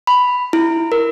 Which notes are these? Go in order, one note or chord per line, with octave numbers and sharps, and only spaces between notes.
B5
E4
A#4